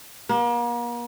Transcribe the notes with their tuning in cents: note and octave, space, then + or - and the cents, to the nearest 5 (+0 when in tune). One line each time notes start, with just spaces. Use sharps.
A#3 +40